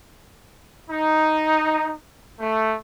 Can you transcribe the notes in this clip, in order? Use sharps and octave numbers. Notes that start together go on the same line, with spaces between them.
D#4
A3